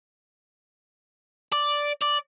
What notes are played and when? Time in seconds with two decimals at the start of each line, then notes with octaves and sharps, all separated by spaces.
1.53 D5
2.02 D5